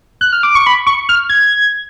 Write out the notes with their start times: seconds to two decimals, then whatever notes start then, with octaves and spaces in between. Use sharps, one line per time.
0.21 F#6
0.32 F6
0.43 D6
0.55 C#6
0.67 B5
0.86 C#6
1.09 F6
1.29 G#6